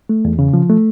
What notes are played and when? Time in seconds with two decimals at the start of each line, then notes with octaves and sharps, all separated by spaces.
0.09 A3
0.25 E2
0.39 C#3
0.53 F3
0.69 A3